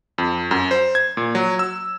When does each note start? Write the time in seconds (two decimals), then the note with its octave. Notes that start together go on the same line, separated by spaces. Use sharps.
0.18 F2
0.51 F#2
0.71 C5
0.95 G#6
1.17 A#2
1.35 F#3
1.59 E6